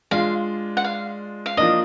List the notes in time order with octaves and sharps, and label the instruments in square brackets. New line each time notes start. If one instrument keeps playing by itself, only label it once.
[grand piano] G#3 D4 F4 [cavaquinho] F5
[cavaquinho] F#5
F5
F5
[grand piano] F3 A#3 D4 [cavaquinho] D#5